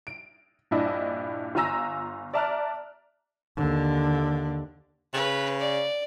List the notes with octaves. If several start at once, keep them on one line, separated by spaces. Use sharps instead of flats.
D7
A#1 G2 D4 E4 D#5
G1 F4 G#5 A#5 E6 A#6
D5 E5 A5 A#5 F6 F#6
D#2 D3
C#3 B4
D5